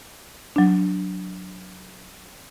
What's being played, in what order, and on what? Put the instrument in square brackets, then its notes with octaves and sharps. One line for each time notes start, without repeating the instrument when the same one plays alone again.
[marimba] F#3 D4